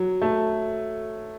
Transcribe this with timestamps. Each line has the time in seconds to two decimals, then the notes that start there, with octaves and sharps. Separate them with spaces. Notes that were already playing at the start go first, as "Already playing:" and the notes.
Already playing: F#3
0.22 A3